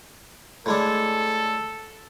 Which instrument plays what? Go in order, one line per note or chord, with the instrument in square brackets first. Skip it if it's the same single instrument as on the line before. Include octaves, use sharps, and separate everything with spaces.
[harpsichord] A2 G#3 D4 [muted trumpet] A4